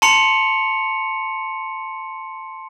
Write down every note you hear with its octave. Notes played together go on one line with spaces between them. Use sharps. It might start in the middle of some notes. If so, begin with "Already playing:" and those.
A5 A#5 C6 C#7 F7